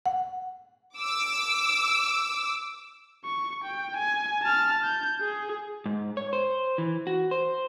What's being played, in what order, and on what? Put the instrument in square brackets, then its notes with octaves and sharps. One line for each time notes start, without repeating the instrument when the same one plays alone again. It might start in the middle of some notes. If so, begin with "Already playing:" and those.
[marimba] F#5
[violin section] D6 E6
[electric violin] C#6
G5
G#5
A5 F6
G6
G#4
[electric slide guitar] G#2
C#5
C5
E3
F#4
C5